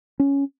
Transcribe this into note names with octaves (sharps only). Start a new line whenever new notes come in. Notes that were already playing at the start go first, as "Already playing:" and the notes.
C#4